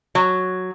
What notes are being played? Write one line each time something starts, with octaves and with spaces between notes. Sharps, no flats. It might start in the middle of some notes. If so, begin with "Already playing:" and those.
F#3